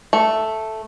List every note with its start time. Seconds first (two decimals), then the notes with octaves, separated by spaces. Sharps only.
0.13 A3